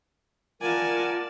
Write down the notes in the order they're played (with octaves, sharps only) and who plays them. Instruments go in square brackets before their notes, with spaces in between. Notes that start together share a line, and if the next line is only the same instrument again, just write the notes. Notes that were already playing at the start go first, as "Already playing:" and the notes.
[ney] F4 [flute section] A#4 F#5 [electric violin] D5 A5 [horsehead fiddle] G#5